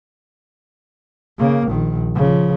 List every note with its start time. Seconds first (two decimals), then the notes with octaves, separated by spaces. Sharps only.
1.38 C#3 A#3
1.67 A#1 D#3
2.15 C#3 F3